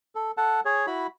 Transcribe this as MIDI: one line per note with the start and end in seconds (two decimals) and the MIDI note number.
0.15 0.31 69
0.37 0.60 69
0.37 0.60 78
0.37 0.60 81
0.65 0.86 68
0.65 0.86 73
0.87 1.07 64
0.87 1.07 66
0.87 1.07 83